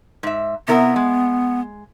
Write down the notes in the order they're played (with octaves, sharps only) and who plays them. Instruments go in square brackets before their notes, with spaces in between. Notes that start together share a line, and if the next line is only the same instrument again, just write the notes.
[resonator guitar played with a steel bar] G#2 E5
[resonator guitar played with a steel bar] C3 E4 A#4 [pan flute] B3
[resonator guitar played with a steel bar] G#3